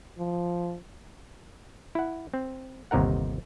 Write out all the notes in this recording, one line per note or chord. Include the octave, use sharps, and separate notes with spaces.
F3
E4 F#5
C4
G1 D#2 C3 D#4 A#4 F#5